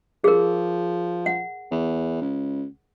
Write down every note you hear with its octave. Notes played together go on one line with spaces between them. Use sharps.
F3 G#4 A#4
F#5
E2
C#2